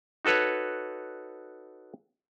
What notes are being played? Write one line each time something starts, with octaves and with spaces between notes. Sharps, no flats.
D#4 F#4 A4 B4 C#5